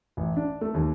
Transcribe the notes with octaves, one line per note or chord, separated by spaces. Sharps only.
A1
D4
A3
D#2